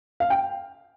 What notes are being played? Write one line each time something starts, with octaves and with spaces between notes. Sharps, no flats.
F5
G5